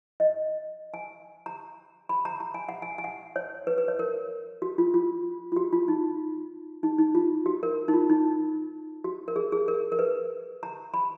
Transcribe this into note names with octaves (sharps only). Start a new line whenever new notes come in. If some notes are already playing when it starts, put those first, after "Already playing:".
D#5
G#5
A#5
B5
A#5
A#5
G#5
F#5
G#5
G#5
F#5
C#5
B4
B4
C#5
A#4
F#4
F4
F4
F4
F#4
F4
D#4
D#4
D#4
F4
F#4
A#4
D#4
F4
D#4
F#4
A#4
G#4
G#4
A#4
A#4
B4
A#5
B5